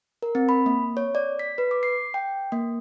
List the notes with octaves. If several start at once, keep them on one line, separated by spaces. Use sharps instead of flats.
A#4
C4
B5
A#3
C#5
D5
B6
B4
D6
C7
G5
A#3